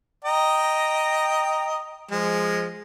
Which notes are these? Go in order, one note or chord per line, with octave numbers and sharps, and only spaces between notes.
D#5 G5 A#5
F3 G#3